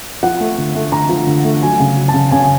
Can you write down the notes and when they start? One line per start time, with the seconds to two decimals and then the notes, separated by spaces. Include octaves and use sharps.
0.23 F3 F#5
0.40 A3
0.58 D3
0.75 A3
0.92 D3 A#5
1.09 F3
1.27 D3
1.44 A3
1.62 F#3 G#5
1.80 C#3
1.97 F#3
2.08 A5
2.14 C#3
2.31 C#3 G#5